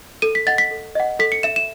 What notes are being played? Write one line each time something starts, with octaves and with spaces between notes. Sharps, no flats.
A4 D#7
B6
D#5 F#5 A6
B6
A4
D#5 F#5
A4 B6
C#7
E5 E7
E7